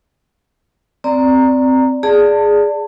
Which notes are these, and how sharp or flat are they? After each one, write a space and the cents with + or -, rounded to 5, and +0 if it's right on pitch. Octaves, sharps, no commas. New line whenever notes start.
C4 -10 D5 +0 A#5 -5
G#4 +0 D5 +0 A5 +25